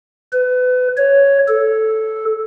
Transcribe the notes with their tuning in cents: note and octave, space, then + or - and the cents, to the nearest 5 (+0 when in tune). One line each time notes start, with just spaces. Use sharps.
B4 +30
C#5 +5
A4 -5